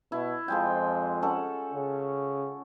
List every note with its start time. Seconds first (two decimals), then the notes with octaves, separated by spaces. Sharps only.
0.12 B2 E4
0.48 F2 F3 G#3 G5
1.22 C#4 A4 F#5
1.74 C#3